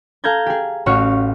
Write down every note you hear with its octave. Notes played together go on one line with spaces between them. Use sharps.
A4 F5 A5 A#5 G6 G#6
G4 G#4
A1 F#4 C#5 F5 C#6